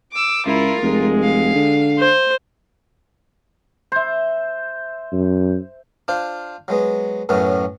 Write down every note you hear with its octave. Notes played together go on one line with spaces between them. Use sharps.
D6 E6
C#2 E4 F4 A#4
F1 G#3
F5
D3
C5
C5 E5
F#2
D4 F4 C5
F#3 G#3 B3
F#2 A2 F#3 B3 C#4